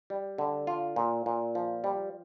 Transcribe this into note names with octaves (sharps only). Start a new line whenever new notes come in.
G3
D3
F4
A#2
A#2
F3
G3